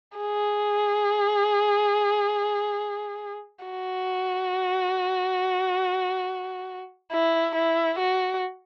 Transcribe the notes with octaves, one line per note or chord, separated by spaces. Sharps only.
G#4
F#4
E4
E4
F#4